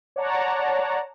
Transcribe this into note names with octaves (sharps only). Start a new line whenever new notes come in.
C#5 D5 F#5 A5 A#5